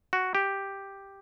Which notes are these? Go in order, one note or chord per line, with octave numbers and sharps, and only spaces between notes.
F#4
G4